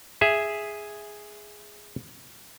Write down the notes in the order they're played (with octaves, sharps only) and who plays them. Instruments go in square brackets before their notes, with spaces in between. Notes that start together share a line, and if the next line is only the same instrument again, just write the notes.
[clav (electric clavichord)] G#4 E5